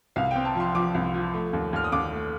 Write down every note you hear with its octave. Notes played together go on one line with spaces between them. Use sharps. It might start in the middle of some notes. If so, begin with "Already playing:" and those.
C2 F5
C4 G5
A5
F3 C6
F3 D6
C2
F3
A3
D#2
D#2 F6
D#6
D#2 D6
A3